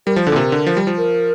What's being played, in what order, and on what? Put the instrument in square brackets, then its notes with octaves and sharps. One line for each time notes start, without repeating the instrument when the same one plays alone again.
[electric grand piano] G3 [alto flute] A#4
[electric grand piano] F3
[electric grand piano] D3 [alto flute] A4
[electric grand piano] A#2
[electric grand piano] C3 [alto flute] A#4
[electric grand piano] D3
F3
G3
F3
[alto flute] A#4